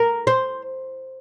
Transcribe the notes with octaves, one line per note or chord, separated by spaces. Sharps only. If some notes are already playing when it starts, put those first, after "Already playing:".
Already playing: A#4
C5